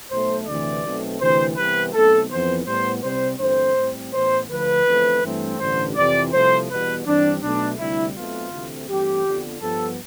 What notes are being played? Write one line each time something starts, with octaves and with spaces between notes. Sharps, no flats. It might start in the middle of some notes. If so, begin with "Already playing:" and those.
B1 B2 A3 C5
D2 C3 E3 D5
B1 B2 A3 C4
D2 C3 E3 C5
C2 C3 E3 B3 B4
B1 B2 A3 C4 A4
F2 E3 B3 C5
A2 G3 B3 C5
C2 C3 G3 C4 C5
G1 G2 E3 A3 C4 C5
A2 G3 C4
A1 A2 E3 B3 C5
D2 D3 F3 B4
E2 D3 F3 A3 C4
G2 E3 A3 C4
A1 G2 D3 C5
F2 C3 E3 D5
C2 C3 F3 A3 C5
E2 B2 G3 B3 B4
G2 E3 G3 C4 D4
B1 B2 A3 D4
D2 C3 G3 E4
B1 B2 A3 C4 F4
D2 C3 E3 A3 C4
G2 E3 A3 C4 G4
F2 D3 F3 B3
G2 F3 B3 A4